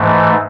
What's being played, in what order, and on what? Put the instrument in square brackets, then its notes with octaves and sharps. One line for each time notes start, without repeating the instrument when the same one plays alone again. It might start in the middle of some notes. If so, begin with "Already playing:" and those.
Already playing: [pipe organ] G#2 E3 A3